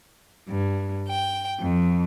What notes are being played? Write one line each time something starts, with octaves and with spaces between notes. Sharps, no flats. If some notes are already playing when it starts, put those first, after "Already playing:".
G2
G5
F2